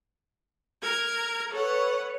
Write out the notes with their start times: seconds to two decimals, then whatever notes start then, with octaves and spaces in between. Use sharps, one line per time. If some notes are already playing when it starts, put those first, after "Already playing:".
0.82 A#4 G#6
1.52 A4 B4 C#5 F#5